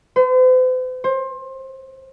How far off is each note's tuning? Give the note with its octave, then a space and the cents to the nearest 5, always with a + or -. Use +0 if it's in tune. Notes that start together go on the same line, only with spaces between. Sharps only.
C5 -45
C5 +25